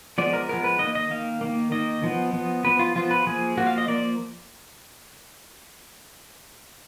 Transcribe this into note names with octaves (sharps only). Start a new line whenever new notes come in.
F3 G#3 B3 D5
A#4
F3 G#3 B3 A#4
B4
D#3 A#3 D#5
D#5
D#3 A#3 F5
D#3 A#3
D#3 A#3 D#5
F3 B3
F3 B3
F3 B3 B4
F4
F3 B3 F4
B4
F3 A#3 G#4
F3 A#3 F#4
F5
D#5
F3 A#3 D5